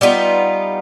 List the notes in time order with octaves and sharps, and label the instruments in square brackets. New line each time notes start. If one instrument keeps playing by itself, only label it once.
[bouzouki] G3 B3 D#4 F4